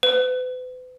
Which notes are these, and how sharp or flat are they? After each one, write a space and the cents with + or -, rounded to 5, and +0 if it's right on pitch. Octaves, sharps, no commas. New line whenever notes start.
B4 +40